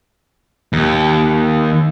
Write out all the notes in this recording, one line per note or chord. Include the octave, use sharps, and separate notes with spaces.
D#2